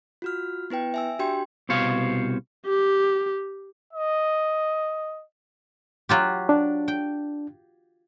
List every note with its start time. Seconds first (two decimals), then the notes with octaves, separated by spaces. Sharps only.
0.22 F4 F#4 F6
0.70 B3 E4 B4 G5
0.94 E5 G#5 E6
1.19 D4 F#4 G4 G5 C6
1.69 C2 B2 C5 C#5 F5
2.66 G4
3.93 D#5
6.09 F#3 F4 G4
6.49 D4
6.88 G5